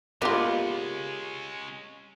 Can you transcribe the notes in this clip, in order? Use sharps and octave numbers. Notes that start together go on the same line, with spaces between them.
G#3 A#3 B3 C#4 F4 G4 D#5